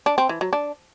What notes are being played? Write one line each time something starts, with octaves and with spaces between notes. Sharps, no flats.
D4
C4
E3
F#3
D4